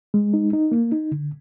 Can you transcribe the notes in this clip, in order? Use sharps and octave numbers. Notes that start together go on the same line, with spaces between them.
G#3
D#4
D#4
A#3
D#4
D3